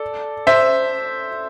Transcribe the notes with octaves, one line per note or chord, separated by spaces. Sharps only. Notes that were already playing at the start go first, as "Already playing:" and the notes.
Already playing: A4 D5
C5 E5